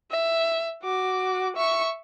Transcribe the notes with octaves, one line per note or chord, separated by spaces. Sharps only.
E5
F#4 D6
E5 C#6